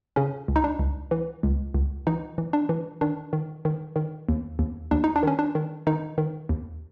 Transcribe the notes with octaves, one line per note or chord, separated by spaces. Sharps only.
C#3 C#4
C#2
D#4
D4
C#2
E3
C#2
C#2
E3 D#4
E3
D4
E3
D#3 D4
D#3
D#3
D#3
D#2
D#2
D#2 D4
D#4
D4
D#3 C#4
D4
D#3
D#3 D#4
D#3
D#2